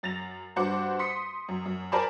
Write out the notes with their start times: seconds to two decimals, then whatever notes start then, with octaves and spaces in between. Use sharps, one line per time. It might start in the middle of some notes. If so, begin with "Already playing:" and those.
0.03 F#2 A6 A#6 F7
0.56 G2 F#4 C5 F#5 D6
0.99 C6 D#6 B6 C#7
1.48 F#2
1.66 F#2
1.92 A#4 C5 D5 G#5 A5 B5